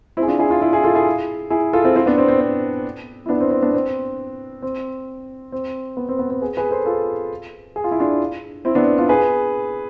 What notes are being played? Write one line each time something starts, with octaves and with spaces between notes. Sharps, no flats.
C4 E4
G#4
D4 F4
E4 G#4
D4 F4
E4 G#4
E4 G#4
F4 A4
E4 G#4
E4 G#4
F4 A4
C4 E4
C4 E4
B3 D4
C4
C4
C4
E4
B3 D4
C4
C4
B3 D4
C4
C4
C4
B3
C4
B3
C4
G#4 B4
G#4 B4
A4 C5
F4 A4
G#4
F4
E4
D4 F4
C4 E4
B3 D4
D4 F4
G#4 B4